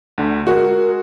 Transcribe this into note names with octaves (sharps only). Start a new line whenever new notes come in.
D2 D3
G#3 F#4 G#4 A#4